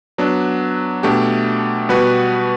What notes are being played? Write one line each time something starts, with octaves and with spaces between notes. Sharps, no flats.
F#3 B3 D4
B2 A3 D4 G4
B2 G3 B3 F#4 B4